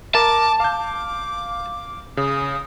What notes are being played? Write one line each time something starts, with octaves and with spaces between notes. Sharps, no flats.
A#4 A5 D6
F5 D6 G6
C#3 D#6